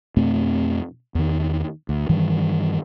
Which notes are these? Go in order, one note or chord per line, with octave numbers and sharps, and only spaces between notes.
F2 B2 A3 C4
E2 D#3
D2
G2 D#3 E3 G3